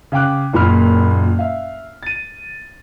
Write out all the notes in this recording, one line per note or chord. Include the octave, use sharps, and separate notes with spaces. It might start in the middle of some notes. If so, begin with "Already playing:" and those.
C#3 F5 G5 D6 F#6
F#1 A#2 B5 F6
E5 F5
A6 D#7